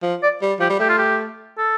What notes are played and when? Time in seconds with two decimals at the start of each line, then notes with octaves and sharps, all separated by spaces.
0.03 F3
0.23 D5
0.42 G3
0.60 F3 G4
0.70 G3
0.80 A3 G4
0.89 F4
0.98 G4
1.58 A4